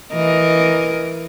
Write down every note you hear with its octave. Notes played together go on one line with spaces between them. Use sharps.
E3 A#4 D#5